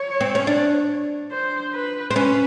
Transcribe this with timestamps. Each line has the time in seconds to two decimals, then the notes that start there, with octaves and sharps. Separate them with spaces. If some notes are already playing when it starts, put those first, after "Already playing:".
Already playing: C#5
0.21 C4
0.35 C#4
0.47 D4
1.31 C5
1.74 B4
2.11 C4
2.15 C#4 B4